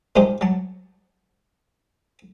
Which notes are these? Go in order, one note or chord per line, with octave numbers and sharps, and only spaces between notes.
A#2 F3 G#3 D#4 G4 C5
F#3 A5